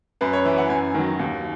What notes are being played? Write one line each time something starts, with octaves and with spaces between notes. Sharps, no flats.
F#2 B4
C#5
E3 E5
F#5
F#2 G#5
D#3 F#3
D#2